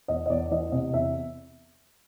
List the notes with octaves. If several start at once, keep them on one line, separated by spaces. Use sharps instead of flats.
E2 D#5
D#5
E2 D5
E3 D#5
C3 D#5
E2 E5